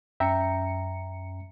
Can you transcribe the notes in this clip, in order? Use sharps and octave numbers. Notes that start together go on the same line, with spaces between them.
F#2 C#4 E5 G5 A#5 C#7